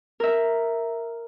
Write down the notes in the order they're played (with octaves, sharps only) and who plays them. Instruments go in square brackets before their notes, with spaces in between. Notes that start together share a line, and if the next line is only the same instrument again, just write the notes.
[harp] A#4 E5